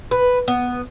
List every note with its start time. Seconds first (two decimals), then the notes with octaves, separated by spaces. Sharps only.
0.11 B4
0.48 B3